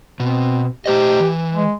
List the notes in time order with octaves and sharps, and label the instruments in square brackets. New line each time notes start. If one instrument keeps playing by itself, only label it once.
[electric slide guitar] B2 [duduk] C4
[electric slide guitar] A3 C5 D#5 [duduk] G4
[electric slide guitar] E3
[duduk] G#3